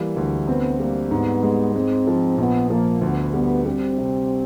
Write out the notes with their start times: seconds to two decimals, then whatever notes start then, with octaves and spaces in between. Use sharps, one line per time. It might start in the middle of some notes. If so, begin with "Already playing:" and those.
Already playing: E3 G3 A#3
0.16 D2
0.47 B3 C4
0.79 G3 A#3
1.11 G#2 B3
1.43 G#3
1.74 G#3 C4
2.07 F3
2.38 A#1 B3
2.70 F3 A#3
3.02 D2 B3
3.33 G3 B3
3.65 G3 C4
3.98 C3